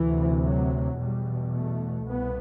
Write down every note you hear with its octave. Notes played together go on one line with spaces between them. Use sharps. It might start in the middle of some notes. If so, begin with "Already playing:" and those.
Already playing: D2 C3 E3
F#3
E2 B2 G3
A3
C2 B3